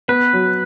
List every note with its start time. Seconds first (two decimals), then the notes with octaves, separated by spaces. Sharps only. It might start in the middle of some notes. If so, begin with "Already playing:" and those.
0.08 B3 B4
0.33 F#3